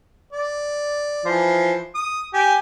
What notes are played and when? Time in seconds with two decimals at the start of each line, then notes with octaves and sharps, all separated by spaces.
0.32 D5
1.25 E3 F3 C5
1.95 D#6
2.33 G4 G#5